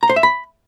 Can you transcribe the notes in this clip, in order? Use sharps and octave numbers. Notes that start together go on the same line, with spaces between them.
A#5
C5
E5
B5